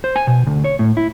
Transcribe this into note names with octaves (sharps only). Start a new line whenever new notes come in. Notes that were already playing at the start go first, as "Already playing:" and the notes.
C5
G#5
B2
D2
C#5
A2
E4